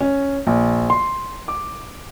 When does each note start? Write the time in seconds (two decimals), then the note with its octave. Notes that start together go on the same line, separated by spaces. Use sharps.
0.01 C#4
0.47 A#1
0.90 C6
1.48 D6